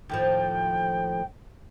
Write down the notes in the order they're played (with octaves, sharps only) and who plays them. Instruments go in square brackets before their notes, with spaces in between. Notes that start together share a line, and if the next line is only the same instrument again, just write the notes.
[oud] D#2 A2 F3 [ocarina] G5